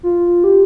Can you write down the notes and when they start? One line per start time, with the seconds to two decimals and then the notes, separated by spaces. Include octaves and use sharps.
0.03 F4
0.44 G4